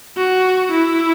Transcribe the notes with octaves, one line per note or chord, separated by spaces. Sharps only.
F#4
E4